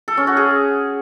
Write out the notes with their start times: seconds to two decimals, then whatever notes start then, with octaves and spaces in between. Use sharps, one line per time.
0.08 A4
0.17 C#4
0.27 F#4
0.37 G#4